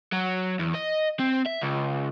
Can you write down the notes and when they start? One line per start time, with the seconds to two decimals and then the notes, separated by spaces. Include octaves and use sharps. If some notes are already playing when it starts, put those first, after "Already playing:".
0.12 F#3
0.59 E2
0.75 D#5
1.19 C4
1.46 E5
1.62 C#2